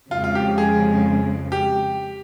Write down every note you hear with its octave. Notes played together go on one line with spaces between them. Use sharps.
F2 C#3 G#3 F4
F4
G4
G#4
G4